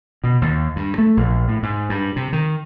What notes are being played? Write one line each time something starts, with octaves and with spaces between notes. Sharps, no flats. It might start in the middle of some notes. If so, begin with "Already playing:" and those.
B2
D#2
G2
A3
A#1
A2
G#2
G2
C3
D#3